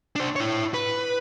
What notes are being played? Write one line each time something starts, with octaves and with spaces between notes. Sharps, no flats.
D4 C5
E4 C#5
B4